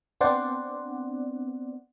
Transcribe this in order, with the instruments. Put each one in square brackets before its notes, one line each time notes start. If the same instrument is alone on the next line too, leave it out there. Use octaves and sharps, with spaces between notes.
[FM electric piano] B3 C4 D4 C5 D5 F#5